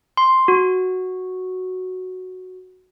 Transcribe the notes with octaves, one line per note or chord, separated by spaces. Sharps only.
C6
F#4